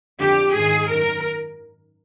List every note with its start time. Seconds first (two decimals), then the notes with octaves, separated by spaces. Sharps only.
0.20 F2 D3 G4
0.55 G#2 D#3 G#4
0.89 F#2 D#3 A#4